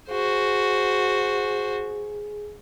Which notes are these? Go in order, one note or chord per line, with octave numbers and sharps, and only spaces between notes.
F#4 G#4 C5